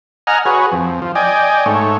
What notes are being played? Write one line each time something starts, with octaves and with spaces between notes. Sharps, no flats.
D#5 F#5 G#5 A#5 F6
F#4 G#4 B4 C#5
F2
F3
D5 D#5 G5 G#5
G#2 A3 C#5